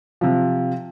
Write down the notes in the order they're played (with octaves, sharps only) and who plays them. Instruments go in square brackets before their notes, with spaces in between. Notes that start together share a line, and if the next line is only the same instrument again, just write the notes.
[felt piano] C3 F3